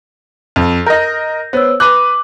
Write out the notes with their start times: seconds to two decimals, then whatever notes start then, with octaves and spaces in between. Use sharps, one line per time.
0.56 F2
0.86 A#4 D#5 G6 A#6
1.53 B3 C5 C#5 E6
1.80 B4 D6 F#6